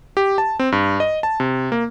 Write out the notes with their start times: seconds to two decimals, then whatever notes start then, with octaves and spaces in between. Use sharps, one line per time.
0.17 G4
0.38 A5
0.59 C4
0.72 G2
1.00 D#5
1.23 A5
1.40 C3
1.72 A#3